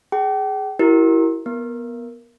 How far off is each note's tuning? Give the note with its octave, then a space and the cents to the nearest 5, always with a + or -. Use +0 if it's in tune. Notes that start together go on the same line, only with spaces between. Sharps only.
G#4 +5 G5 -40
E4 +0 G4 -45 A#4 +0
B3 -20 A#4 +0